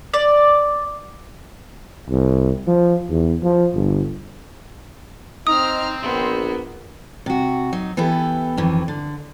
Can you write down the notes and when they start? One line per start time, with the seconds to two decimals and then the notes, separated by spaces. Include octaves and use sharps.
0.14 D5
2.10 C2
2.67 F3
3.09 E2
3.43 F3
3.74 G1
5.47 C4 D#4 A#5 D#6 F6
6.02 A#1 A#3 B3
7.26 C3 F#4
7.73 F#3 D#4
7.97 E3 B3 E4 G4 A4
8.57 F2 D#3 E3
8.88 D3